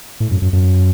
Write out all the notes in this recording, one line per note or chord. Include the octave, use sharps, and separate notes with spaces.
A2
F#2
F#2
F#2